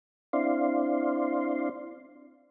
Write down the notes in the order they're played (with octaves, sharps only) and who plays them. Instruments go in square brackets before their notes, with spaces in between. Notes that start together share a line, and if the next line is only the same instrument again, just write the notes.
[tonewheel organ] C4 D4 E4 D5 F5 C6